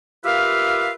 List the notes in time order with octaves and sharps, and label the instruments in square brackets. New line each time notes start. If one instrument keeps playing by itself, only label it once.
[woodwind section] F4 G4 A#4 B4 E5 F5